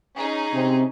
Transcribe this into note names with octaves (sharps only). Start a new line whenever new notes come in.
C#4 D#4 G#4
C3 C4